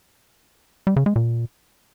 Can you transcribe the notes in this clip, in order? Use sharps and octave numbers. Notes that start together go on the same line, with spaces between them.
G3
C#3
G#3
A#2